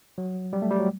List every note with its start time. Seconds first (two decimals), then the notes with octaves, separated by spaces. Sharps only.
0.18 F#3
0.53 G3
0.62 A3
0.71 G3
0.79 F#3